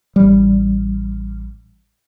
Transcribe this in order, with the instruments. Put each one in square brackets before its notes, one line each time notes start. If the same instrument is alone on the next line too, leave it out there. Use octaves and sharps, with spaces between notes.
[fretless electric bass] A1 G3